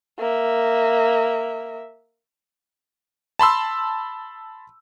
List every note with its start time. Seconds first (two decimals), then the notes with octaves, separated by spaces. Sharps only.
0.19 A#3 E5
3.39 A5 B5 C6 E6